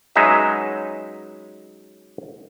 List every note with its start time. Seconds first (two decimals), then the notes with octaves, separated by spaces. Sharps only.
0.16 F#3 G#3 C#4 D#4 B4 E5